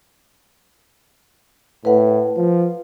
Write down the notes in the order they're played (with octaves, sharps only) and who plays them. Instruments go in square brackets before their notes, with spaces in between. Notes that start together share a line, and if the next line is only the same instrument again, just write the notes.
[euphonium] A2 [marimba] B4 F#5
[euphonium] F3